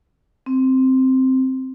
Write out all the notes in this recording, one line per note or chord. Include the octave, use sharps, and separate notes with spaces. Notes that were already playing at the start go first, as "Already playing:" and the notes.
C4